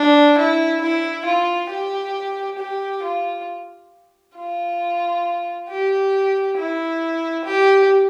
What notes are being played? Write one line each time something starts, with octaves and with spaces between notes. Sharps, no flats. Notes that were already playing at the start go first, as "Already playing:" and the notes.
Already playing: D4
E4
E4
F4
G4
G4
F4
F4
G4
E4
G4